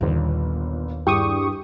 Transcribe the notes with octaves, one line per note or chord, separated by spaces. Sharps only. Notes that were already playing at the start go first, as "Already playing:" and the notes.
G1 D#2 A#2
G2 E4 G4 G#4 C#6 D#6